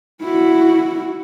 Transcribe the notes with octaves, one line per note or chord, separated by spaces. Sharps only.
E4 F#4